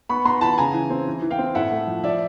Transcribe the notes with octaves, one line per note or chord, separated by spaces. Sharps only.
B3 B5 C#6
B3 A#5 C6
E3 A5 B5
C#3 G#5 A#5
E3
C4
E3
E3
F5 G5
C4
A2 E5 F#5
A3
F3
F3 D5 E5